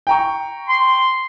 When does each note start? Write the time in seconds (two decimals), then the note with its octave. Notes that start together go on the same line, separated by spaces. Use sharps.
0.07 G5 A#5 C#6
0.69 C6